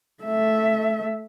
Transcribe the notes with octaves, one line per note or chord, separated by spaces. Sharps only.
A3 E5